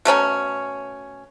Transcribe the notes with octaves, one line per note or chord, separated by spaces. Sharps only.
B2 A3 C#4 A#5